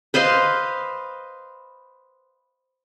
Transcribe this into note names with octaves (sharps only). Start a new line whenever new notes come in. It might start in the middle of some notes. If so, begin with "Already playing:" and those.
B4 C5 D#5 F5